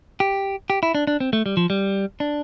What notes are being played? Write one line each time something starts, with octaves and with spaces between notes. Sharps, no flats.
G4
G4
E4
D4
D4
C4
A3
G3
F3
G3
D4